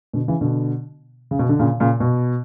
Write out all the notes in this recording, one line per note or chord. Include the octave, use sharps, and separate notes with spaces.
B2 D3
C#3 E3
B2 D3
C#3
B2
D3
A#2 C#3
A#2 C#3
B2